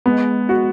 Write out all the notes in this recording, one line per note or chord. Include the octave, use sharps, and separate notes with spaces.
G#3 B3
F#4